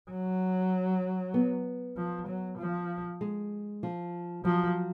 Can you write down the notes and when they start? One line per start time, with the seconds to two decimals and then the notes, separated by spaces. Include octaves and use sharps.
0.11 F#3
1.34 B3
1.97 F3
2.27 F#3
2.58 F3
3.21 G#3
3.83 F3
4.45 F3 F#3